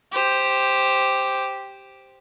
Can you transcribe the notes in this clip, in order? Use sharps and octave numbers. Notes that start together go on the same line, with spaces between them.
G4 C5